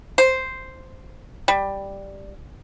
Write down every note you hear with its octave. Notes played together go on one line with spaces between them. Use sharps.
C5
G3